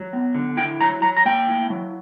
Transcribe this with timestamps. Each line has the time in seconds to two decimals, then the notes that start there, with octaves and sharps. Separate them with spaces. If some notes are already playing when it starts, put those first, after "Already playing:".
Already playing: F#3
0.13 B3
0.35 D3
0.57 E4 G5
0.80 F#3 A#5
1.02 F#3 A#5
1.17 A#5
1.25 A#3 G5
1.48 E4
1.70 F#3